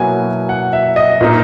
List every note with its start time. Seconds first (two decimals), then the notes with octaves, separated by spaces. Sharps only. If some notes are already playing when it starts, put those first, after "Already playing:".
Already playing: B2 F#3 A#3 E4 G#5
0.49 F#5
0.73 E5
0.96 D#5
1.21 A#2 A#3 D#4